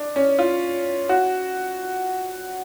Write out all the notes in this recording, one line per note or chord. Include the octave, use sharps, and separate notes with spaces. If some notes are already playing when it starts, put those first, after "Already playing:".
Already playing: D4
C#4
F4
F#4